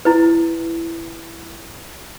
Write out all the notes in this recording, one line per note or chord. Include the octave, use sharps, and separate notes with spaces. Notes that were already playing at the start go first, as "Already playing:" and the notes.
E4 B4